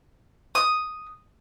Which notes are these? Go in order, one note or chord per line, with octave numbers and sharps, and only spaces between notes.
D#6